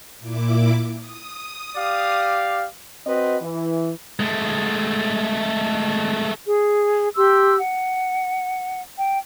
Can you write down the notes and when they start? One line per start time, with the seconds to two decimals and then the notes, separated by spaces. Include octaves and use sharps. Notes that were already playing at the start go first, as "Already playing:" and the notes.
0.20 A#2 E4 D6
0.99 D#6
1.76 G4 D5 F5
3.06 C4 F#4 B4 D#5
3.42 E3
4.20 G#3 A3
6.46 G#4
7.16 G4 C6 E6
7.58 F#5
8.99 G5